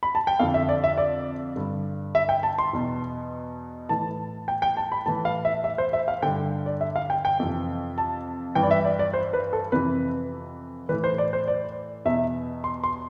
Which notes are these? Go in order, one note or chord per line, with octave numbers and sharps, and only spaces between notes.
B5
A5
G5
F2 D3 F5
E5
D5
E5
D5
G2 D3
E5
G5
A5
C6
E2 B2
A2 E3 A5
G5
G5
A5
B5
A2 E3 A5
F5
E5
E5
C5
E5
F5
G2 D3 G5
D5
E5
F5
G5
G5
F2 C3 E3
A5
G2 E3 G5
D5
E5
D5
D5
C5
B4
A4
F2 C3 E3 B4
A2 E3 B4
C5
D5
C5
D5
E2 B2 E5
C6
C6